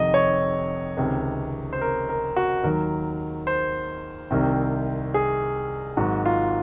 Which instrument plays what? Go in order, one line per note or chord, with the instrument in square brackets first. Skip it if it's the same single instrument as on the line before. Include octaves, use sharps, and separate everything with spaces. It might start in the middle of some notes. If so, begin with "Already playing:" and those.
Already playing: [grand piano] F1 F2 C3 D#3 D#5
C#5
C#2 C3 D#3
C5
A#4
A#4
F#4
D#2 D#3 F#3 A#4
C5
C2 C3 D#3
G#4
G#1 G#2 F#3 F#4
F4